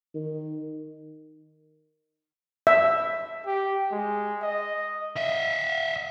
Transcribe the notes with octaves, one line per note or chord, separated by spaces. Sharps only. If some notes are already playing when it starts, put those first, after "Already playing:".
D#3
E5
G4
G#3
D#5
D#5 E5